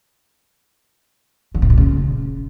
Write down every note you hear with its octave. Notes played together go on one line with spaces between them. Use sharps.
D#3
B2
C3
C#3